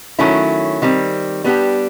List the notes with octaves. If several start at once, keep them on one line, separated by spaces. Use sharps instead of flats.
D#3 F#3 A3 C#4 E4
D#3 G3 C4
G3 B3 D4 G4